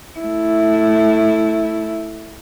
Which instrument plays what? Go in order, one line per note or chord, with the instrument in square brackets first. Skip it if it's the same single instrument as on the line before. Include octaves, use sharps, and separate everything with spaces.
[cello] A3 E4